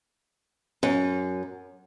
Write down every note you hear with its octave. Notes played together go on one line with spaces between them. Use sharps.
F#2